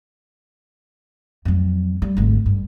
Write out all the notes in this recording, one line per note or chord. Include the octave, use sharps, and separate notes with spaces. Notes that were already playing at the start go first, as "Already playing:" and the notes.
F2 F#3
G3
G#1 D2
G2